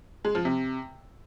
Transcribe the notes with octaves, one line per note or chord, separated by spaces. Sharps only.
G#3
F3
C3